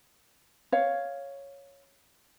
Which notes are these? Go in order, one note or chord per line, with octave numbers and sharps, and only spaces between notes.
C#5 F5